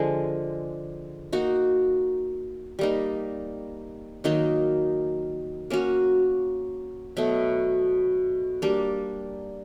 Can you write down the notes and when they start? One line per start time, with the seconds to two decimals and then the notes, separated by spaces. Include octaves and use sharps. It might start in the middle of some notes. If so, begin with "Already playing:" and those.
Already playing: D3 F3 G#3
1.33 A#3 D#4 F#4
2.79 G3 A#3 D#4
4.24 D#3 F#3 A#3 D#4
5.70 A#3 C#4 F#4
7.17 B2 F#3 A3
8.62 G3 A#3 D4